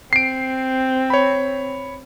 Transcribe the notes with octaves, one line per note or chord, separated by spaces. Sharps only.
C4 C7 D7
C#5 B5